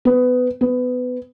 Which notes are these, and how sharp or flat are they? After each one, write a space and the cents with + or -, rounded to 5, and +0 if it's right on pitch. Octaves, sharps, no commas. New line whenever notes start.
B3 +20
B3 +20